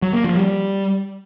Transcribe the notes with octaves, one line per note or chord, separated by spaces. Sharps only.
F#3
A#3
F3
G3